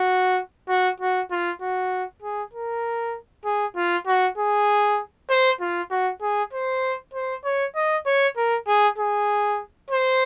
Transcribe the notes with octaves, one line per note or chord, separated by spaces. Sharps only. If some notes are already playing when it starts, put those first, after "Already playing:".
Already playing: F#4
F#4
F#4
F4
F#4
G#4
A#4
G#4
F4
F#4
G#4
C5
F4
F#4
G#4
C5
C5
C#5
D#5
C#5
A#4
G#4
G#4
C5